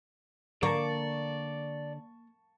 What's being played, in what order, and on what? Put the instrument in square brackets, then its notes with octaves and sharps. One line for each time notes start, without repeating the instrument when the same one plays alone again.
[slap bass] D3 [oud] A#3 [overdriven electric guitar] D5 [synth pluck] A5 C#6